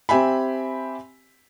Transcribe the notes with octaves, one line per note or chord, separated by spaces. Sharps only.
C4 G4 E5 G#5 B5